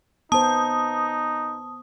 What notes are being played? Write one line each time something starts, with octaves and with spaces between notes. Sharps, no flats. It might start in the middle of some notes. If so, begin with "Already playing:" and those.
B3 D#4 C5 A5 D#6